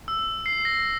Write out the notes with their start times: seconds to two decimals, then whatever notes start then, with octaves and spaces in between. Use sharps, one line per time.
0.08 E6
0.46 C7
0.65 A#6